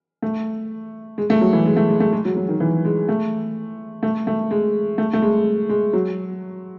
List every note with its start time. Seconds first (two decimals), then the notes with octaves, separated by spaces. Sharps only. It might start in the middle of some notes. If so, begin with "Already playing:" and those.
0.22 A3
1.18 G#3
1.30 A3
1.41 F#3
1.53 E3
1.66 G#3
1.76 A3
1.89 G#3
2.00 A3
2.13 G#3
2.25 F#3
2.36 F#3
2.48 D#3
2.60 E3
2.85 G#3
3.09 A3
4.03 A3
4.27 A3
4.51 G#3
4.98 A3
5.13 A3
5.22 G#3
5.69 G#3
5.93 F#3